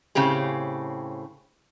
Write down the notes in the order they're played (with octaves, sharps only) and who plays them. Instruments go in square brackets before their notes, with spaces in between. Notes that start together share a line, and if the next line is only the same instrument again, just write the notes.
[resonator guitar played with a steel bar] A2 C#3 C4 G4 G#4